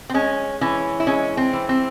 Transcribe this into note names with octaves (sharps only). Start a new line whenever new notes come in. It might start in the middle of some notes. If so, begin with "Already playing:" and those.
C4
G#3 C#4
E3 C#4
E4
G#3 C#4
C4
E3
C4